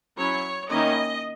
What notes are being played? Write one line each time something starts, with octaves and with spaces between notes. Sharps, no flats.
F#3 C#4 E4 C#5
D#3 A#3 C#4 E4 D#5